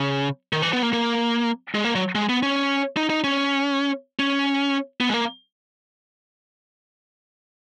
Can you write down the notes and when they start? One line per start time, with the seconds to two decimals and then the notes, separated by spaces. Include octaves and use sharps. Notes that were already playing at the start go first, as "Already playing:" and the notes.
Already playing: C#3
0.53 D#3
0.62 E3
0.73 B3
0.82 A#3
0.93 A#3
1.75 G#3
1.85 A#3
1.95 F#3
2.15 G#3
2.29 B3
2.43 C#4
2.97 D#4
3.10 D#4
3.24 C#4
4.19 C#4
5.00 B3
5.09 G#3
5.14 A#3